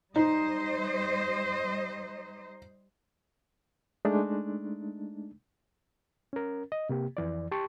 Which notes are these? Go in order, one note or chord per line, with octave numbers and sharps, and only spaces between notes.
G3 D#4 C5 D#5
G#3 A3 D4 D#4
C#4 A#4
D#5
C3 A#3 G4
F2 E3 D5
G4 A5 C6 C#6